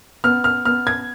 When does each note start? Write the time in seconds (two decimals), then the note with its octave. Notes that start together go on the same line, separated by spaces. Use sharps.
0.24 B3 F6
0.44 F6
0.65 B3 F6
0.87 G#6